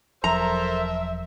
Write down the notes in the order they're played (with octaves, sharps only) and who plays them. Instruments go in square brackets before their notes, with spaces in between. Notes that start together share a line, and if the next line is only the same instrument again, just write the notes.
[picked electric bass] E1 F3 F#3 [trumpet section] A4 A#4 C5 [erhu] E5 [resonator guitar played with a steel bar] A#5